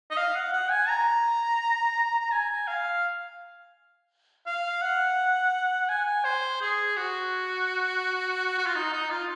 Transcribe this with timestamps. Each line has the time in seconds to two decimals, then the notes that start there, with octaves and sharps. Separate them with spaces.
0.11 D#5
0.17 F5
0.35 F#5
0.53 F#5
0.71 G#5
0.89 A#5
2.20 A#5
2.31 G#5
2.67 F5
4.46 F5
4.82 F#5
5.89 G#5
6.25 C5
6.61 G#4
6.96 F#4
8.58 F#4
8.66 F4
8.75 D#4
8.93 D#4
9.10 F4